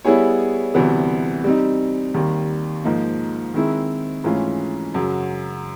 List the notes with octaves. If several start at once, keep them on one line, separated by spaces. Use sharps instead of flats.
G3 B3 E4 G#4 C#5
D2 C3 E3 G3 B3
G3 C4 D#4
D#2 D#3 G3
G#2 F3 A#3 D#4
D#3 G#3 C4 E4
G#2 E3 A3 C#4 F4
F#2 C#3 F#3